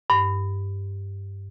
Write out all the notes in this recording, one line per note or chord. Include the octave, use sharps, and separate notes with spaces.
G2